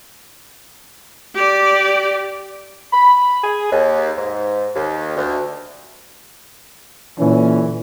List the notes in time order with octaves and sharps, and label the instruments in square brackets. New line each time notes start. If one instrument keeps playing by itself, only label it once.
[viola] G4 D5
[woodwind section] B5
G#4
D#2
G#2
D#2
D2
[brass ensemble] A#2 D3 C#4 [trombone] E3